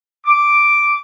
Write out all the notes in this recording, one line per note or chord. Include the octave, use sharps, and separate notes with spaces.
D6